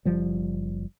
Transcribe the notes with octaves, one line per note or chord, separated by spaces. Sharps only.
F#1 F3 G3